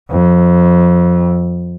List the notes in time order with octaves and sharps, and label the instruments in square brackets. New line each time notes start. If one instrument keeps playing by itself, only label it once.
[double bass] F2